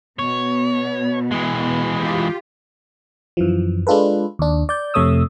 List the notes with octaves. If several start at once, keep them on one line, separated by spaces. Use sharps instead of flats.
B2 B3 C#5
E3 G#3
F4 G4
F#2 E3 F3
G#3 D4 F4 A4 B4
D#2 D4
D5 G6
F2 C3 A3 C#5 D#6 E6